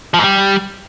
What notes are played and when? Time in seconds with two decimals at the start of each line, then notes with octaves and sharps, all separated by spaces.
0.14 F3
0.19 G#2
0.24 G3